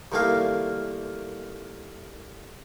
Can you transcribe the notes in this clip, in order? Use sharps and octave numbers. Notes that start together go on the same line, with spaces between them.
C2 D#3 A3 A#3 F5